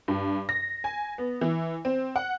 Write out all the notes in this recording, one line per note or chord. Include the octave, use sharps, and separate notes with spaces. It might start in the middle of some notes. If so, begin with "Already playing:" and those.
G2
A#6
G#5
B3
E3
C4
F#5